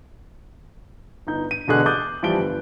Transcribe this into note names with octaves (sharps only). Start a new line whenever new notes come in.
G1 D#4 G6
D#7
E1 B2 D3 G#4 F#6
D6 D#6 G6 A6
E3 F3 G3 A5 D7 G7
G1